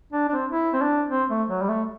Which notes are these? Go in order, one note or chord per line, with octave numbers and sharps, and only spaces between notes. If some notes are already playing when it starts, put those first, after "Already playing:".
D4
D4
C4
E4
C4
D4
C4
A3
F#3
G3
A3